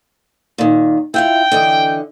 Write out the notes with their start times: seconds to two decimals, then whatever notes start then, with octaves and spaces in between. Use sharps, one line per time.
0.58 A#2 D#3
1.14 E4 F4 F#5 G5
1.52 D3 E3 D#5